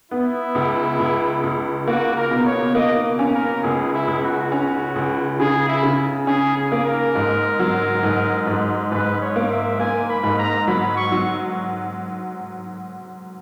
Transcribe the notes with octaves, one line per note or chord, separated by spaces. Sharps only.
B3 E4
C#2
C#2
C#2
A#3 F#4
A#4
B2
C#5
A#3 D#5
C#4
A#4
C#2 G#4
E4
C#2
F#4
C#4 F#4
C#2
C#3 G#4
E4
C#3
C#4 G#4
G#4
A#3
A#4
G#2
F#3
G#2
G#2
G#2 B4
C#5
A#3
E5
A#3 G#5
B5
G#2
A#5
F#3 B5
C#6
F#3